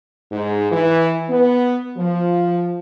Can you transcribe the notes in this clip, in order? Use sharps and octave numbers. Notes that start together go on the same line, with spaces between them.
G#2
E3
B3
F3